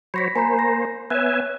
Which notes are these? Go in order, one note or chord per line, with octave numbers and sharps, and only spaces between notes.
F#3 C5 C#5 B5 A#6 B6
A#3 C5 G#5 A#5 B5
A#6
B3 C#5 E5 G#5 F#6